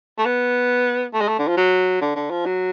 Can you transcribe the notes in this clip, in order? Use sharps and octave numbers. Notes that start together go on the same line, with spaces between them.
A3
B3
A3
G#3
A3
D3
F3
F#3
D3
D3
F3
F#3